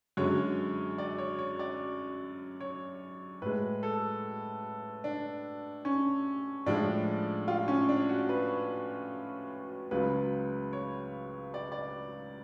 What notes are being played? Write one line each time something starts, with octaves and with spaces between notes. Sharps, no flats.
F#2 D3 G#3 C#5
D5
C#5
C#5
D5
C#5
A2 G#3 B4
A4
D4
C#4
A2 F3 G#3 D4
F4
C#4
D4
F#4
B4
C#2 C#3 F#3 B4
C#5
D5
D5